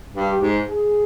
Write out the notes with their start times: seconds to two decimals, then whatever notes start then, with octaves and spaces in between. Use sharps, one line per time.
0.14 G2
0.27 G4
0.40 G#2
0.66 G#4